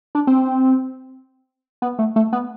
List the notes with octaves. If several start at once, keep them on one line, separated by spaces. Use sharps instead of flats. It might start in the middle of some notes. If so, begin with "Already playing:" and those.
D4
C4
B3
A3
A3
B3